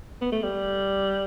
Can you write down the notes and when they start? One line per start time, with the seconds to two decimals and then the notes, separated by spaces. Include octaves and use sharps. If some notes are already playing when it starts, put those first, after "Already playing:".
0.21 B3
0.32 A3
0.42 G3